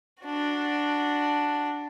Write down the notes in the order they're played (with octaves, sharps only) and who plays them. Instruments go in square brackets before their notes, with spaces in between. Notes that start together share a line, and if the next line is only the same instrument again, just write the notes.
[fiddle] D4 F#4